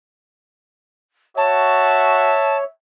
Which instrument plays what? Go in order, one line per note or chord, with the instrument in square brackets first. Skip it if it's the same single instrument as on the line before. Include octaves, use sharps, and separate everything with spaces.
[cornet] F#4 [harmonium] C#5 [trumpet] E5 [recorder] A5